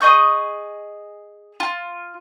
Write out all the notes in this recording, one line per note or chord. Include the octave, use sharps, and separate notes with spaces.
G#4 D#5 C#6 G6
F4